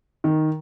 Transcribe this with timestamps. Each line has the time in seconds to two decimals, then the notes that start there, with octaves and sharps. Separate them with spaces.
0.24 D#3